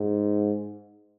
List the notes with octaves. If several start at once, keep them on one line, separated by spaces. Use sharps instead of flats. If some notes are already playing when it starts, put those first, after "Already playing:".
Already playing: G#2